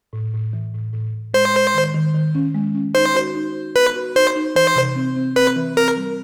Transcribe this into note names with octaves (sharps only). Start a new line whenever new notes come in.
A2
A2
E3
A2
A2
A2
G#3 C5
G#3
D#3
D#3
D#3
C#4
G#3
C#4
D#4 C5
F#4
D#4
F#4
B3 B4
F#4
D#4 C5
D#4
E3 C5
C3
C4
C4
C4 B4
E3
C4 A#4
G3